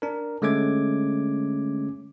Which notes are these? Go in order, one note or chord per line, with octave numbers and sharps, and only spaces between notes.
D4 A#4
D3 G#3 A3 C#4 D6 G#6